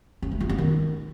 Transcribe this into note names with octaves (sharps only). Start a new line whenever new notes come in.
C#4
A3
F4
B3
D#3